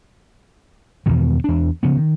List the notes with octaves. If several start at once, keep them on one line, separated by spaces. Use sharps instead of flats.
E2 G2 B2 D#3
E2 D4
C#3 F3 B3
D#3